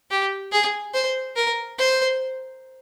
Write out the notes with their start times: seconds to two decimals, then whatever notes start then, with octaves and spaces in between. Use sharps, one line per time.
0.11 G4
0.52 G#4
0.94 C5
1.36 A#4
1.78 C5